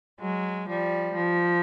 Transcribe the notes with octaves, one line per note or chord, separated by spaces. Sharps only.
F#3 G#3
F3 G3
F3